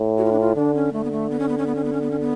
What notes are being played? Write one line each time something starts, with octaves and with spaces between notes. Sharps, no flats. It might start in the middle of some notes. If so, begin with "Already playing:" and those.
Already playing: A2
F#4
F4
D4
F4
D3 D4
C#4
D3 A3
B3
A3
B3
C#4
B3
C#4
B3
C#4
B3
C#4
B3
C#4
B3